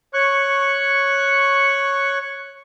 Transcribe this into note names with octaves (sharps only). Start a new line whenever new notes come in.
C#5 C#6 F#6